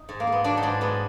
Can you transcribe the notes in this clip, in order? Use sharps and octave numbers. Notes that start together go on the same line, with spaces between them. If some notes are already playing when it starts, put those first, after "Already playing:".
Already playing: D#4
G#2
A#3
G#2
B3
F#3 D4
D#4
G#2 D4
G#2 B3